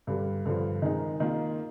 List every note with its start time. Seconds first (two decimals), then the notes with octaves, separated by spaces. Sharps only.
0.07 G2 D3 G3
0.45 G2 D3 F3
0.82 D#3 G#3 D#4
1.20 D#3 A#3 F4